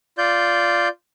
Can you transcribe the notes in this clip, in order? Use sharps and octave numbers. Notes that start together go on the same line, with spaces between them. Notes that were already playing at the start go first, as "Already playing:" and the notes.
F4 D5 G6